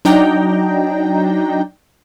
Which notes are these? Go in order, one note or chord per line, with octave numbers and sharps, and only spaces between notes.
F#3 D4 D#4 G5 A#5